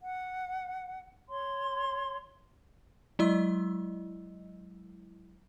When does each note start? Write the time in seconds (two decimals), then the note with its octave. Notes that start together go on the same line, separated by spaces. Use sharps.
0.02 F#5
1.28 C#5 C6
3.19 F#3 G#3 E4 D#5 E6